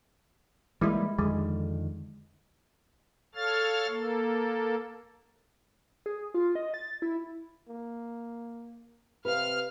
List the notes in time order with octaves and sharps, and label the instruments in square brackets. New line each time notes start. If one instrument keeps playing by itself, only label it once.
[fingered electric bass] E3 G3 A#3 [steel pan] G#3 E4
[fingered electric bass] F2 D3 D#3 [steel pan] G#3
[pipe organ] A4 C#5 F5 F6 A6
A#3 A4
[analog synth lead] G#4
F4
D#5
A6
E4
[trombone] A#3
[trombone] C3 [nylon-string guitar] B4 [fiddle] F5 [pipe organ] F6